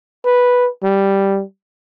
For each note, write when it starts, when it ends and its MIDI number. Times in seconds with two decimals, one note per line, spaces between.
0.25 0.68 71
0.83 1.42 55